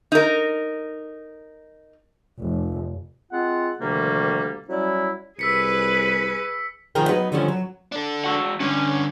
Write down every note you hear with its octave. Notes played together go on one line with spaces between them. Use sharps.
D#4 A#4
F1
G#3 C4 F4 F#5
D2 C3 D#3 F3 G3 A#3
F#3 G3 C#4 E4
C2 G#4 B4 E6 B6 C#7
B2 D#3 F3 G#4 A#4 G5
F#3 B3 D#4 F#4 B4
D3 D#3 F3 G3 C#4
F#3
D4 A4
G#3 F#4 F#5
G2 D3 C#4